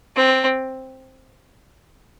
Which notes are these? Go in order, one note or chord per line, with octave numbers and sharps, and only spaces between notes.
C4